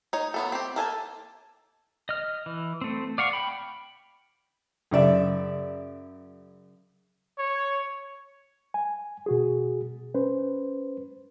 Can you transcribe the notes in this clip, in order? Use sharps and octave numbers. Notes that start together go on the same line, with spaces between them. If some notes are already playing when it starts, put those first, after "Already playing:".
D#4 C#5
F#3 B3 A4
C4 G4
A#3 A4 G#5 A5
D#5 F6
E3
A3 C4
D5 F5 F#5 C#6
G5 B5
F#2 C#3 D5 E5
C#5
G#5
B2 F#4 G#4
C#4 B4 C5